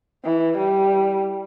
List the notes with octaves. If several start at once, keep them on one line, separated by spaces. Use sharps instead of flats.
E3
G3